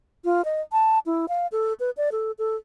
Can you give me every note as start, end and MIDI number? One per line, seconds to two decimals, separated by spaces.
0.25 0.44 65
0.45 0.61 75
0.72 0.99 81
1.06 1.26 64
1.29 1.47 77
1.52 1.73 69
1.80 1.91 71
1.97 2.09 74
2.12 2.32 69
2.39 2.56 69